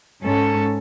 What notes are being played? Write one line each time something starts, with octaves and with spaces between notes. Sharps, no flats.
G#2 C#4 A4